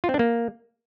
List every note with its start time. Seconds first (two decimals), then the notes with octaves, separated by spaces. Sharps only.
0.04 F4
0.09 C4
0.14 D4
0.19 A#3